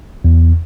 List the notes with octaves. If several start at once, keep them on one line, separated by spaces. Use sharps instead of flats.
E2